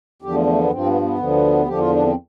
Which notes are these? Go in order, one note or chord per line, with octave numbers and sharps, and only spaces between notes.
E2 D3 F3 G4
A3
A3
B3
G2 F3 C4
B3
B3
D2 D3 F3
E2 D3 F3 G4
F4
D4
C4